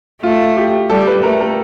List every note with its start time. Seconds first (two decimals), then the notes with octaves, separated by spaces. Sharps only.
0.23 A3 F4
0.57 G4
0.90 G3 A4
1.07 B4
1.23 A3 A#4
1.41 A#4